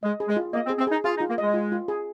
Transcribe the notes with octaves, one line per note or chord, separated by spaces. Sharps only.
G#3 D#5
G#4
G#3
F4
A#3 D#5
C4
G#4
C4
D#4 G#4
F4 G#4
D#4
F4
A#3
G#3 D#5
F4
F4
G#4